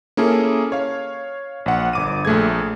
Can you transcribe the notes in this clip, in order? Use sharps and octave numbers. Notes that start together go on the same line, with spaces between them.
A#3 C#4 E4 G#4 A4
C#5 F5
A#1 F#5
G1 D6 D#7
A#1 A3 G#4 G#6